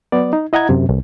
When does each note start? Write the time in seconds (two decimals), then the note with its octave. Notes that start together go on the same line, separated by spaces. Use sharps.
0.12 F#3 B3 D5
0.33 D#4
0.53 E4 D#5 F#5 A#5 G#6
0.69 F#2 C3
0.89 C2